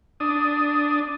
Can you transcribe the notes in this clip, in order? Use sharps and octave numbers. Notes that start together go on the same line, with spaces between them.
D4 D#6